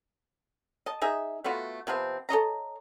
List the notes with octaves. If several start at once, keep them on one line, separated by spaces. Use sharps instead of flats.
D#5 A5
D#4 G#4 E5
A3 B3 F4 F#4
C3 F3 B3 C4
A4 C#5 D#5 A#5